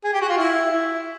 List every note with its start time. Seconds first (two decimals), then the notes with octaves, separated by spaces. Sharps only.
0.04 G#4
0.13 G4
0.21 F#4
0.29 F4
0.37 E4
0.71 E4